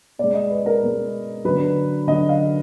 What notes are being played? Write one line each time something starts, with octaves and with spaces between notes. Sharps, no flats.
B2 D5
G#3
D#5
B4
A#4
B2 G#3
D3 F#3 B4
D3 F#3 D#5
F5